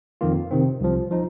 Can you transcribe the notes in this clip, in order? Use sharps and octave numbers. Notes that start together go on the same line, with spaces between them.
F2 D#3 A#3 F4
C3 D#3 C4
C2 C3 F3
F3 D#4